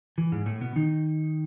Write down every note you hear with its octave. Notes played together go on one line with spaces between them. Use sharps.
E3
G#2 G#3
A2 A3
B2 B3
D#3 D#4